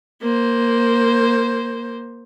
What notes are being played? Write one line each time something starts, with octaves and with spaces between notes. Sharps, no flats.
A#3 C5